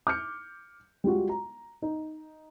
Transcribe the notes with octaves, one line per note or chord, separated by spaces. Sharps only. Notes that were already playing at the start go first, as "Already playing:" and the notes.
D6 F6 G6 C#7
G3 G#3 F4 F#4
A#5
D#4